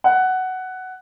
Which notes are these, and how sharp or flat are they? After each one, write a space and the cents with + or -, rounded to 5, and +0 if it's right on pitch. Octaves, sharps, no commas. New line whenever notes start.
F#5 +10